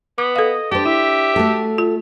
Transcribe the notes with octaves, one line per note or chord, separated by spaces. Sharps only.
B3 D6
A4 D#5 F5
D4 G4 C5 A5
E4 E5
A3 F#4 A4
F4